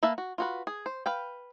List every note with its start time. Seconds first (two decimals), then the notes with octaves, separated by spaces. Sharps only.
0.03 A#3 B4 E5 A5
0.18 F#4
0.38 F4 F#4 B4
0.67 G#4
0.86 C5
1.06 B4 F5 G5